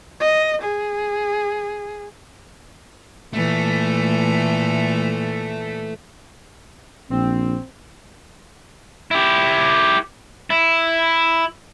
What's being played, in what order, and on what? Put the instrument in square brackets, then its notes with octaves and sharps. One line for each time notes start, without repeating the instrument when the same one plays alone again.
[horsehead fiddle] D#5
G#4
[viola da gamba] A#2 E3 [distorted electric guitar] A3
[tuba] A#1 [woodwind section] C4
[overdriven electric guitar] E4 G4
E4